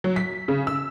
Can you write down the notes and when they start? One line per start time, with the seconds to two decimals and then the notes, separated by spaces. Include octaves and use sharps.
0.04 F#3
0.16 B6
0.48 C#3
0.67 E6